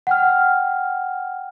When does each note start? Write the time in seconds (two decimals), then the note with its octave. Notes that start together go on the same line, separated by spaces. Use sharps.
0.07 F#5 G5 F6